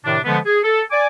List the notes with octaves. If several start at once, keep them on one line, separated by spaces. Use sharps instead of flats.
A2 C3 D#3 D4
D3 F3 G#3 A3 B3
G#4
A4
D5 G#5 D6